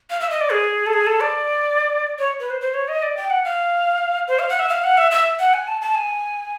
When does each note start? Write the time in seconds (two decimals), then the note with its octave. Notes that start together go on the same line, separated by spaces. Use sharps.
0.10 F5
0.20 E5
0.30 D#5
0.41 D5
0.51 G#4
0.86 A4
0.93 G#4
1.07 A4
1.21 D5
2.19 C#5
2.40 B4
2.50 C5
2.61 C5
2.74 C#5
2.88 D#5
3.02 D5
3.17 G5
3.30 F#5
3.45 F5
4.28 C5
4.39 F5
4.49 F#5
4.59 E5
4.69 F5
4.84 F#5
4.97 E5
5.11 E5
5.39 F#5
5.54 G#5
5.68 A5
5.81 A5
5.95 G#5